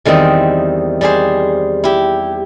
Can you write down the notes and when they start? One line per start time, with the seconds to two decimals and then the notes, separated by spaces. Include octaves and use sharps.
0.05 E2 D#3 G3 C4 D#5
1.01 G3 G4 G#4 C5
1.84 E4 G4